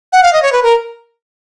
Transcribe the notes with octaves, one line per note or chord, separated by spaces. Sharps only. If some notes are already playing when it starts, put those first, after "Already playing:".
F#5
F5
D#5
C#5
B4
A#4